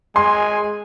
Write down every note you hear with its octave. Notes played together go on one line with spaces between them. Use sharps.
G#3 G#5 C6